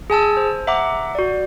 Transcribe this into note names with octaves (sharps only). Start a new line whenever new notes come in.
G#4 G#5 A5 E6
C5
E5 F#5 A#5 D6
F#4 D5